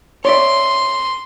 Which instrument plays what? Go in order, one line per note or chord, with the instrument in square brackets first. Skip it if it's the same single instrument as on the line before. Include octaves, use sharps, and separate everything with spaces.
[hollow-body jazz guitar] C#5 D5 E5 [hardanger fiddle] C6